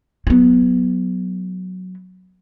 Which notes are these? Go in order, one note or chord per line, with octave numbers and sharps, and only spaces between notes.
F#3 B3